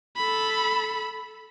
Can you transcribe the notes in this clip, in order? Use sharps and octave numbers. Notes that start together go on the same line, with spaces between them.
A4 B5